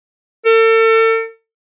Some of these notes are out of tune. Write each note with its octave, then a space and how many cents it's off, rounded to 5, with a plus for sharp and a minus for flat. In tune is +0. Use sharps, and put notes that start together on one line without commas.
A4 +40